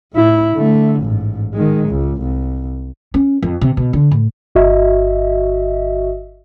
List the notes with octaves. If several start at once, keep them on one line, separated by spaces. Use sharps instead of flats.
A2 E4
D3 A3
A1 G#2
D#3 G#3
C#2
C2
C#4
F2
C3
B2
D3
A2
G1 F#4 D#5 E5